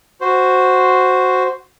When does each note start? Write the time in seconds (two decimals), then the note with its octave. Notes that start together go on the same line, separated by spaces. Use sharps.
0.21 F#4 C5